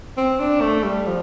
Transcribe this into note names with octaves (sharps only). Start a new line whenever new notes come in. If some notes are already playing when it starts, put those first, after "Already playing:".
C4
D4
A3
G3
F3